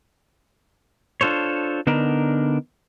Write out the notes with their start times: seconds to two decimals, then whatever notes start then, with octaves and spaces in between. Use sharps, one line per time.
1.21 D4 F4 A4 C5 C#5
1.87 D3 B3 D4 D#4 A#4